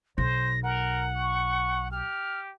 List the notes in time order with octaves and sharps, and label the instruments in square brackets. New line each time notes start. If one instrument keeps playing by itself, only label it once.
[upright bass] B1 [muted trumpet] C5 [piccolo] A#6
[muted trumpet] A#4 [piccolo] F#5
[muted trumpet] C#6
[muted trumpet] G4 [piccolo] F6